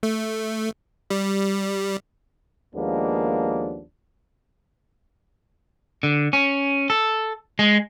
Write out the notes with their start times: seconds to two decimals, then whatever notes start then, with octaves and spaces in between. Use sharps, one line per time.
0.03 A3
1.10 G3
2.75 D#2 F3 G#3 A#3 B3 D4
6.03 D3
6.33 C#4
6.90 A4
7.59 G#3